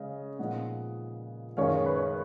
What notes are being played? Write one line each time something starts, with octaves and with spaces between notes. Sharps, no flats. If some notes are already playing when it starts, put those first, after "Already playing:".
Already playing: C#3 G#3 D#5
A#2 F3 G#3 B3 D#4 D#5 F#5
F#2 D#3 G#3 C#4 C#5 F5
B4
C#5